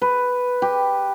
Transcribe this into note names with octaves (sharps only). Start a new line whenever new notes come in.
B4
G4